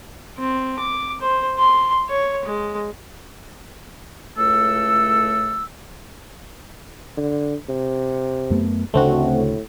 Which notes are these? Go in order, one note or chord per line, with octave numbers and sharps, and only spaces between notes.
C4
D6
C5
C6
C#5
G#3
C#2 A2 A3 A4 E6
D3
C3
F#2 A3 B3
A1 D2 C#3 A3 C4 D4 F#4
A2